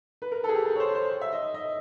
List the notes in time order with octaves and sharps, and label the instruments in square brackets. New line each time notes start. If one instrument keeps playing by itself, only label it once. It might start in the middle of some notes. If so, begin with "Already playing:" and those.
[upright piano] B4
A#4
G#4 A4
G4
A4
C#5
C5
C5
E5
D#5
D#5